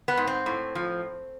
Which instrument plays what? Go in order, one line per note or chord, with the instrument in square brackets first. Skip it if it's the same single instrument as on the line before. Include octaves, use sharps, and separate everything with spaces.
[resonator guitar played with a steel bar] B3
G#2
C4
A2
F3